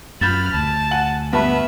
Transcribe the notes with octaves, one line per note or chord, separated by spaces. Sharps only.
F#2 F4 B5 F6 G6 A6 E7
D2 A5
F#5 G#5 F#7
G2 B3 B4 E5 A5 B5